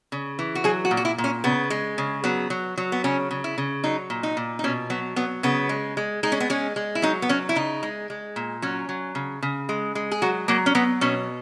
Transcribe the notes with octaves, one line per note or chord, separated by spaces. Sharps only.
C#3
E3
F#4
F#3 G#4
F#4
A#2
F#4
E4
A#2
C#4
C#3 B3
G#3
C#3
F#3 B3
F#3
F#3
B3
C#3 C#4
C#3
E4
C#3
F#3 D#4
A#2
D#4
A#2
D#4
B2 C#4
F#3 B3
F#3 B3
C#3 B3
G#3
G#3
G#3 D#4
C#4
B3
G#3 C#4
G#3
E4
F#3 D#4
B3
F#3 C#4
E4
C#3 D#4
G#3
G#3
A#2
F#3 C#4
F#3
C#3
C#3
G#3
G#3
G#4
F#3 F#4
F#3 A#3
C#4
F#3 B3
B2 C#4